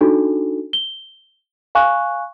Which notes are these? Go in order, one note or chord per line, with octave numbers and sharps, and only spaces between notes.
D4 D#4 F#4 A4
G7
F5 G#5 C#6 F#6